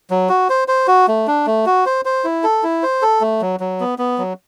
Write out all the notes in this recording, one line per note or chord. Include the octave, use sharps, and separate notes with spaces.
F#3
F#4
C5
C5
F#4
A3
D4
A3
F#4
C5
C5
E4
A4
E4
C5
A4
A3
F#3
F#3
B3
B3
F#3